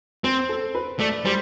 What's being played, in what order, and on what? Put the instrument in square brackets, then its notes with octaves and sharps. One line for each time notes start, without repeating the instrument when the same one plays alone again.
[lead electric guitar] C4 [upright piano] C5
[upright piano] A4
B4
[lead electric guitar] A3 [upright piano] D5
[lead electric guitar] G3 [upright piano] C5